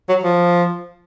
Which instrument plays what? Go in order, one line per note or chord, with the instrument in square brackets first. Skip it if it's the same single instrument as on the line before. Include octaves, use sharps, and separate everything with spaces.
[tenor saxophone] F#3
F3